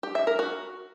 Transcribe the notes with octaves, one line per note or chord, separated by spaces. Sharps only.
G4
E5
A#4
F#4